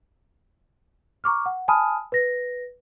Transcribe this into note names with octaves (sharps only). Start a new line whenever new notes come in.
A#5 C#6 D6 F6
F#5
G#5 A5 B5 D#6 F6 D#7
B4 A#6